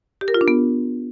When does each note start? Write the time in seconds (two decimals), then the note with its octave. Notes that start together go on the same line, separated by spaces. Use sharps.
0.21 G4
0.28 A#4
0.34 F4
0.41 D4
0.48 B3